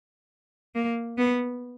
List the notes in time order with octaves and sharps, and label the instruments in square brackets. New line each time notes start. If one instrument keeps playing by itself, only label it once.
[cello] A#3
B3